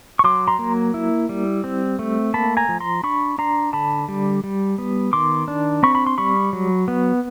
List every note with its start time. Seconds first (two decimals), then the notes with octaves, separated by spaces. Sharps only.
0.19 C#6
0.24 F#3 C6 D6
0.48 A#5 C6
0.59 A#3
0.94 E4
1.29 G3
1.64 C4
1.99 A3
2.34 A#3 A5 B5
2.57 G#5 A#5
2.69 F3
2.80 A#5 C6
3.03 D4 B5 C#6
3.38 D4 A#5 C6
3.73 D3 A5 B5
4.08 G3
4.44 G3
4.78 B3
5.13 D#3 C6 D6
5.48 D4
5.83 C4 B5 C#6
5.95 B5
6.07 C6
6.18 G3 B5 C#6
6.53 F#3
6.88 B3